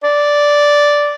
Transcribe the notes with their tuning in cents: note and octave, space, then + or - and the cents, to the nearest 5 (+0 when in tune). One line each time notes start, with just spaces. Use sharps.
D5 -5